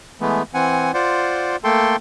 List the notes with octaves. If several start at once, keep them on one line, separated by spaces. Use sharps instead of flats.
E3 G#3 A3 B3
E3 C4 F#5 G#5
F4 C5 D5 F#5
A3 A#3 A4 G5 C6